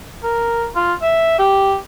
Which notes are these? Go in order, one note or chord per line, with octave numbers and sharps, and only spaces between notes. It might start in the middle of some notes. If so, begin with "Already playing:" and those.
A#4
F4
E5
G4